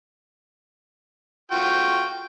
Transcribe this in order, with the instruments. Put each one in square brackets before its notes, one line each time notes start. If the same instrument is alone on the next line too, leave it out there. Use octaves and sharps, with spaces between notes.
[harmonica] F4 F#4 G5